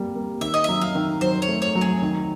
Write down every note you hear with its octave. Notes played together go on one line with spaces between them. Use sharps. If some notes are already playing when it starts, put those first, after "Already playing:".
Already playing: G3 A#3
A#3
D#3 E5
D#5
F#3 E5
F5
D#3
F#3 C5
C#5
A3
C#5
F#3
G#4
D#3